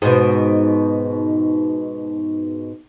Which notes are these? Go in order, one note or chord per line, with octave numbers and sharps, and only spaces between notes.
G#2 B2